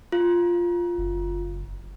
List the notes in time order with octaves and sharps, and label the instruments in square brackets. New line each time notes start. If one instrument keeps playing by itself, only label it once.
[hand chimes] F4
[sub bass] F#1